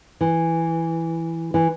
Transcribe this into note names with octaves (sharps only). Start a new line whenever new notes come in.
E3
E3